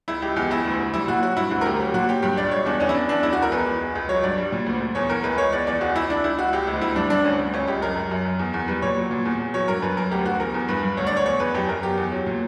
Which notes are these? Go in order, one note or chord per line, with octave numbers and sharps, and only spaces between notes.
C#2 E4
C#2 G4
E2 G4
E2 E4
D2
D2
G3 E4
A#2 F#4
F#3 F#4
G2 E4
D2 F#4
A#4
D2 G4
F#3 G4
A#2 F#4
F#3 G4
G2 G4
C#2 D5
C#2 C#5
E2 D4
E2 C#4
E4
E2 D4
E2 D4
C#2 E4
F#4
C#2
A#4
E2 B4
E2
C#2
C#2
F#3 C#5
G2 D5
G3
A#2
D2
D2
E2 C#5
E2 A#4
C#2 B4
C#2 C#5
E2 D5
E2 D5
C#2 F#4
C#2 E4
C#2 D4
C#2 E4
C#2 F#4
C#2 G4
D2 E4
D2 E4
G2 D4
G2 D4
D2 C#4
D2
C#2 C#4
C#2 G4
F#2 A#4
F#2
F#2
F#2
E2
E2
G3 B4
A#2 C#5
F#3
A#2
E2
E2
F#3 C#5
G2 A#4
F#2 B4
F#2 A#4
D2 G4
D2 F#4
E2 A#4
E2
G2 B4
G2
D2 C#5
D5
D2 C#5
E2 C#5
E2 B4
F#2 G4
F#2 A#4
E2 G4
E2
F#3
A#2